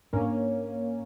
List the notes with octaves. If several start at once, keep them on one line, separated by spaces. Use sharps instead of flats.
G#2 A#3 C#4 D4